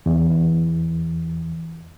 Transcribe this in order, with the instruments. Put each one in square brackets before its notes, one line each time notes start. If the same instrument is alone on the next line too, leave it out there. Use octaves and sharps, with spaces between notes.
[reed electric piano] E2 E3